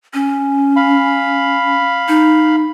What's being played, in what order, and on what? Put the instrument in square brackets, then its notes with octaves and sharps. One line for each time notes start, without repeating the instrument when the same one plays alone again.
[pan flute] C#4
[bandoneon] F5 B5
[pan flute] D#4